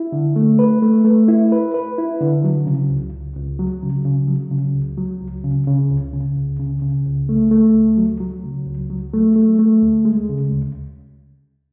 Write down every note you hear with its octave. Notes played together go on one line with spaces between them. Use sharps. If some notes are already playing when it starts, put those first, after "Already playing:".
Already playing: E4
D3
A3
B4
A3
A3
E4
B4
B4
E4
D3
F#3
C#3
C#2
C#2
C#2
F#3
C#3
C#3
F#3
C#3
C#2
F#3
C#2
C#3
C#3
C#2
C#3
C#2
C#3
C#3
C#2
A3
A3
C#2
F#3
F#3
C#3
C#2
F#3
A3
A3
A3
D2
G#3
C#3
D2